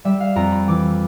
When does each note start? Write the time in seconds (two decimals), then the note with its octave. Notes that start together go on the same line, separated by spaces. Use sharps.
0.05 G3 E5
0.20 F5
0.36 F2 A#5
0.52 B5
0.68 E3 D6